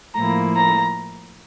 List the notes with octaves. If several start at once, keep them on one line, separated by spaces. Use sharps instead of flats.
A2 F3 A#3 E4 A#5
A#5